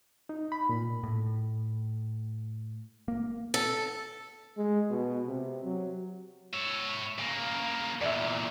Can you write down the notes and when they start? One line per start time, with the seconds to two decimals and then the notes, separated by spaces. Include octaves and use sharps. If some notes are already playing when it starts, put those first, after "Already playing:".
0.29 D#4
0.52 B5
0.69 A#2
1.03 A2
3.08 A#3
3.54 A4
4.57 G#3
4.91 B2
5.27 C3
5.64 F#3
6.54 C#5 E5
7.19 C#3 A#3
8.01 E2 A#2 D5 E5